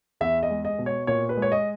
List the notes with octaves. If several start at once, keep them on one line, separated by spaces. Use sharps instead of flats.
E2 E5
D#5
G#3
D#5
B2
C#5
A#2 C#5
B4
G#3
C#5
D#5